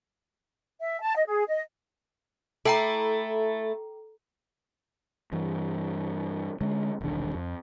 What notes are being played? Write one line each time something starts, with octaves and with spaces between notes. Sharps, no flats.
E5
A5
D#5
G#4
D#5
A3 E4 A4 G5 A#5
G2 E3
D3 G#3 C#4
E1 C2 D#3 D4
F2